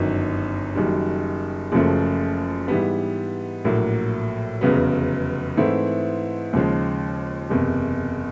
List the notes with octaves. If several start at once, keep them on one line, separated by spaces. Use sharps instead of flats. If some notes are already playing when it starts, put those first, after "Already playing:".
Already playing: G1 F#2 D#3
F#1 F#2 D#3 G3
F#1 F#2 C#3 F3 A3
G#2 E3 G3 B3
A#1 A2 F#3 A#3
F1 E2 C#3 F#3 B3
G#2 E3 A3 C4 E4
D#2 C#3 F3 G#3
F#1 E2 C3